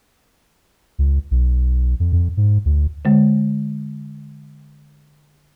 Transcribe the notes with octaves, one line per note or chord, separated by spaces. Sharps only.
C#2
B1
F2
F2
G#2
D2
D3 G#3